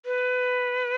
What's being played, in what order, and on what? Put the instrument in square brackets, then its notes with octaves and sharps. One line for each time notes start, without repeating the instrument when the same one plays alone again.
[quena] B4